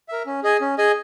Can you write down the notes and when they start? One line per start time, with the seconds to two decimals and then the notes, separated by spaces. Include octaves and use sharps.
0.09 A#4 E5
0.26 C#4
0.43 G#4 D#5 G#5
0.61 C#4
0.78 G#4 D#5 G#5